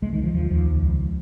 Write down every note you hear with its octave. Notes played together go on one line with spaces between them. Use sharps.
C2 G#3
D#3
C2
F3
D#2 F3
D#2 F3
C#2
C#2